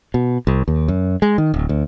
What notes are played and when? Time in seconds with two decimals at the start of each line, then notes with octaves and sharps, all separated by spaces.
0.14 B2
0.47 C2
0.68 D#2
0.88 F#2
1.22 G#3
1.38 D#3
1.54 D1
1.69 D2